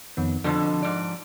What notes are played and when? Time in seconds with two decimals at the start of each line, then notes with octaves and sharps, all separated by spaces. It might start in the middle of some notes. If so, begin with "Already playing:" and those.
0.17 F2 D#3 B3
0.44 F2 B2 D3 F3 A5
0.83 G#2 D5